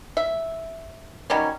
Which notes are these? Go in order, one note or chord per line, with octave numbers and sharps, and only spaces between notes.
E5
D#3 F#3 G3 C#4